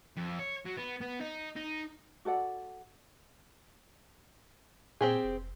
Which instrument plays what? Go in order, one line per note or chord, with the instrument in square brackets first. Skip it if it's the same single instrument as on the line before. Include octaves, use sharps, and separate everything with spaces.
[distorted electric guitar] F2
C#5
F#3
B3
B3
D#4
D#4
[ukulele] F#4 A4 D5 F#5
[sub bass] A#2 [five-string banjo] C4 G4 G#4
[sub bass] F1